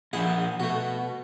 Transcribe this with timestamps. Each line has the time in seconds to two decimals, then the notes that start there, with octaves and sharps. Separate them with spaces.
0.13 A#2 F3 E4 G#4 F#5
0.60 B2 A3 F#4